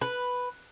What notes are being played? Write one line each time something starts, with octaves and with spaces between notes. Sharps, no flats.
B4